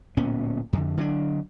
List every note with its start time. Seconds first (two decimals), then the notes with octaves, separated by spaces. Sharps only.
0.17 D1 A#2 B3 C#4
0.73 F2 D3
0.97 D3 F#3 C#4 D4